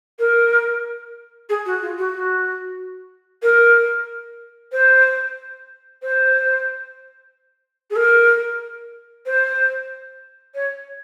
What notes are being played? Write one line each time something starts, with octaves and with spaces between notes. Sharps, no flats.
A#4
G#4
F#4
F4
F#4
F#4
A#4
C5
C5
G#4
A#4
C5
C#5